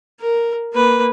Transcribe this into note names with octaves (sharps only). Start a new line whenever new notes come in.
A#4
A#3 B4